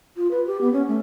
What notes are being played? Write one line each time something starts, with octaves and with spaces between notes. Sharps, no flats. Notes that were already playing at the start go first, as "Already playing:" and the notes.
F4
B4
G4
B3
C#4
A3